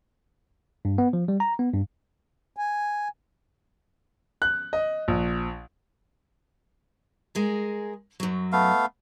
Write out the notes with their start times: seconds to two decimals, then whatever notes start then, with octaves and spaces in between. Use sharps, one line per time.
0.85 G2
0.98 B3
1.13 F3
1.28 G3
1.40 A#5
1.59 B3
1.73 G2
2.57 G#5
4.42 F#6
4.73 D#5
5.08 A#1
7.35 G#3 G#4 A#4
8.20 F#2 F#3
8.53 A3 B3 F5